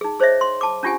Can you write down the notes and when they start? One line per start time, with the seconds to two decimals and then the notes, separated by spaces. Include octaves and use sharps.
0.01 D#4 G#4
0.20 G#4 C5 C#5 D#5 E5
0.41 C6
0.61 A5 D6
0.83 C#4 D4 F4 G4 F#5 G#5